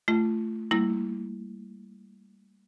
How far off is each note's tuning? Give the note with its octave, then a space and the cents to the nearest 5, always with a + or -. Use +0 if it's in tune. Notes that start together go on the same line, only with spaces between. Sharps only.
A3 +0 F4 -30
G3 +0 A#3 -25 E4 +0